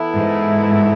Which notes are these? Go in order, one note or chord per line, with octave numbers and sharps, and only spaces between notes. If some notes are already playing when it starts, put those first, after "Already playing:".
Already playing: E3 B3 E4 A4
G#2